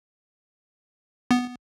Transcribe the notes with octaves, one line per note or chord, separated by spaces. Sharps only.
B3